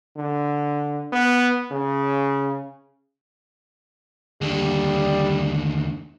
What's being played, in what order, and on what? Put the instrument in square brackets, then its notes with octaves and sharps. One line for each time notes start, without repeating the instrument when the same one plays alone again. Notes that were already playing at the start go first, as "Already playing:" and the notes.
[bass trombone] D3
B3
C#3
[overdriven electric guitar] D#2 D3 [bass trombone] G3